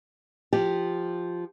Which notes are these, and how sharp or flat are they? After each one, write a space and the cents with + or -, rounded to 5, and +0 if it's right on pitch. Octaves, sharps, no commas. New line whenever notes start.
F3 +0 G4 +0